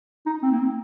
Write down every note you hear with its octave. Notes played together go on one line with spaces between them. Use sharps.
D#4
C4
A#3
C4